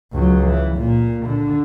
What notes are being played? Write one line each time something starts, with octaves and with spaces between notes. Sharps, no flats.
C#2 F#3
E3
A#2
D3